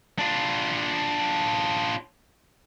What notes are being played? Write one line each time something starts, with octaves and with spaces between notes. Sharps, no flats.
D4 F4